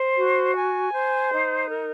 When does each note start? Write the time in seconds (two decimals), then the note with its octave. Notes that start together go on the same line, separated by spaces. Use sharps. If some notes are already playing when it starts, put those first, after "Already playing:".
Already playing: C5
0.17 F#4
0.55 G#5
0.93 C5
1.32 D#4
1.70 A#4